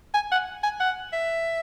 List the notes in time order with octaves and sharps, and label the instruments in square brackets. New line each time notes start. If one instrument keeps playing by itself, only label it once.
[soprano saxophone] G#5
F#5
G#5
F#5
E5